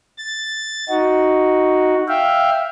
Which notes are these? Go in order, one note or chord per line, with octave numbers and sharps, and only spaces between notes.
A6
D#4 F#4
E5 F5 G5